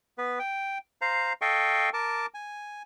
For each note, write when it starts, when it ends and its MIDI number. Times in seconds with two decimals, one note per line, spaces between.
0.18 0.39 59
0.18 0.39 71
0.39 0.78 79
1.01 1.33 72
1.01 1.33 77
1.01 1.33 82
1.42 1.90 69
1.42 1.90 75
1.42 1.90 77
1.42 1.90 79
1.42 1.90 85
1.94 2.26 70
1.94 2.26 81
1.94 2.26 86
2.34 2.82 80